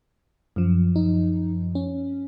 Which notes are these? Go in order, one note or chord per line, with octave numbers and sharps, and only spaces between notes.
F#2 F3
D#4
C#4